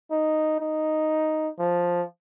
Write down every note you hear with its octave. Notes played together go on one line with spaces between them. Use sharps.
D#4
D#4
F3